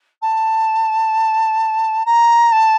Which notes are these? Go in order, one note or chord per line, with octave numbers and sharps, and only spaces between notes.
A5
A#5
A5